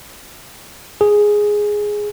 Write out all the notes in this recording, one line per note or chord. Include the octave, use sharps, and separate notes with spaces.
G#4